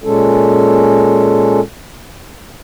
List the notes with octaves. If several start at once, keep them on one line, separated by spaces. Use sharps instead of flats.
A#2 G#3 C#4 A4